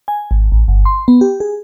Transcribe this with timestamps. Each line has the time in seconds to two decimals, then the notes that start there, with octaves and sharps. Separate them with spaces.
0.08 G#5
0.31 G#1
0.52 A1
0.68 G1
0.85 C6
1.08 B3
1.21 G4
1.40 G#4